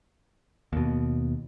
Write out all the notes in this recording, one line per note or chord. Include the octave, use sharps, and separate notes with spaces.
D#2 B2